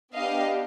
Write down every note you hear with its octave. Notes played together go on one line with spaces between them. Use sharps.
B3 D4 G4 D#5 F5